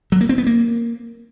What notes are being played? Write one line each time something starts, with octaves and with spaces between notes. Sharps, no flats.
F#3
A#3
C4
B3
A#3